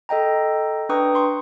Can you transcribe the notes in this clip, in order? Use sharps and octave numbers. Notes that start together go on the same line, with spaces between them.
A4 D#5 G5 A#5
D4 B4 G5 A#5 C#6 D#6
C6 C#6